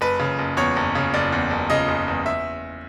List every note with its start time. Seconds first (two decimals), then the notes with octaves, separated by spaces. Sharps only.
0.01 F#1 B4
0.19 C#3
0.39 F#1
0.57 E2 C#5
0.76 F#1
0.95 C#3
1.14 F#1 D5
1.32 E2
1.51 F#1
1.70 C#3 D#5
1.88 F#1
2.08 E2
2.26 E5